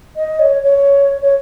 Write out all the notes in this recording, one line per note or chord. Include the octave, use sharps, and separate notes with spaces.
D#5
C#5
C#5
C#5